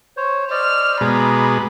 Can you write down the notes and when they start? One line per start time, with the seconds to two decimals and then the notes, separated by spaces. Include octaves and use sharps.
0.17 C5 C#5
0.51 C5 D5 D#5 F6
1.01 B2 G#3 A#5 B5 D6